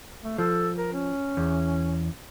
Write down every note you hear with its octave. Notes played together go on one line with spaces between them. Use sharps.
A3
F3 A4
A#4
C#4
E2